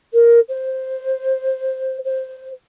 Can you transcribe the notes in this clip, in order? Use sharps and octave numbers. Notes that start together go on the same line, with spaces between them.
A#4
C5
C5